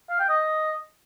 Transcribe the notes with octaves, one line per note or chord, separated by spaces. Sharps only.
F5
G5
D#5